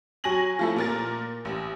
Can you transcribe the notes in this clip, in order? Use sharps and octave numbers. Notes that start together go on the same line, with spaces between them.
F#3 G#5 C#6 A#6 F#7
F3 A3 E4
A#2 A#4 A6
A1